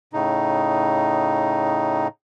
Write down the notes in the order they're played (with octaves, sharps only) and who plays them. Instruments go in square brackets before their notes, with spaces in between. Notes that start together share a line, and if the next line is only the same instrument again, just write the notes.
[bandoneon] A2 C#3 D#4